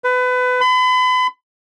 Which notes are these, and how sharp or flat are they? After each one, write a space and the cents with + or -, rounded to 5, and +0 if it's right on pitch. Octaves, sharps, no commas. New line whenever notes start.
B4 +25
B5 +40